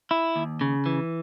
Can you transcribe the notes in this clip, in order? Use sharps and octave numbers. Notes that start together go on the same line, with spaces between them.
E4
D#2
C#3
E3